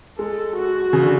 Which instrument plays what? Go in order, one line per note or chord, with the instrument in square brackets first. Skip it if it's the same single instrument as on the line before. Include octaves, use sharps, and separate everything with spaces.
[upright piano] G#3 [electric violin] A4
[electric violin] F#4
[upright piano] C#3
D3